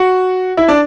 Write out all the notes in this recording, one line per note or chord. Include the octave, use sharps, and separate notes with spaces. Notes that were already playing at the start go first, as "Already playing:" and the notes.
Already playing: F#4 F#5
E4 E5
D4 D5